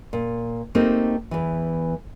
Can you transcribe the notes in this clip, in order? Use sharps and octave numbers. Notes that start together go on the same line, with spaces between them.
A#2
A3 A#3 C4 D#4 G4
E2 E3